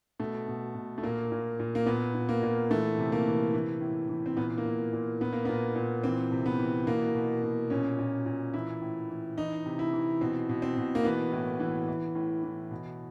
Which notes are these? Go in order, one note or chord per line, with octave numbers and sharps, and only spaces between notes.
B2 A3
B2
B2
A3
A#2 A#3
A#2
A#2
A#3
A#2 B3
A#2
A#3
A#2
E3 A3
C3
A#3
E3
E3
A2
E3
C4
A#2 B3
A#3
A#2
A#2
A#2 B3
A#3
B3
A#2
A#2
E3 C4
C3
B3
E3
B2 A#3
B2
B2
A#2 C#4
A#2
A#2
E3 E4
A2
E3
E3 D#4
C3
E4
E3
B2 C4
B2
C4
B2
A#3
E3 B3
A2
E3
E3
A2
E3
B2